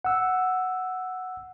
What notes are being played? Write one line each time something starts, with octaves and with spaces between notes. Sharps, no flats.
F#5 E6